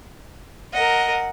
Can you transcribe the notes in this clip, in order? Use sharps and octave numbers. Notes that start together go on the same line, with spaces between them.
A#4 D#5 F#5